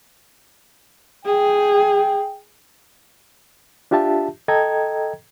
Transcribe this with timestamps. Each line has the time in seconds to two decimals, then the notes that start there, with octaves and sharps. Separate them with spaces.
1.26 G#4 G5
3.91 D4 F4 G4 E5 A5
4.48 A4 D#5 G5 A#5 G#6